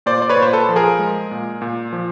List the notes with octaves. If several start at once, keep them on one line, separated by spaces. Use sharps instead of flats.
A#2 C5 D5
D5
B4 C#5
A#2
C5
A4 B4
F3
G#4 A#4
G#3
A#2
A#2
F3